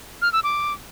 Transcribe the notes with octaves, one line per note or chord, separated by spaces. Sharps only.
F6
E6
D6